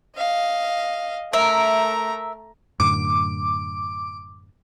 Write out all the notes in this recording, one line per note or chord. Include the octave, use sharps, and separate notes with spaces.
D#5 F5
A3 A#4 E5 A#5
F#2 A2 D3 D6